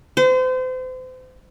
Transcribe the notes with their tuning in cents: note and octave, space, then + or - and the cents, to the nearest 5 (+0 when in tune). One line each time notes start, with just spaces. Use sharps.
C5 -35